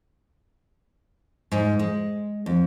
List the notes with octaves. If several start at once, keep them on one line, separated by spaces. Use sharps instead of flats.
G#2
G#3
F2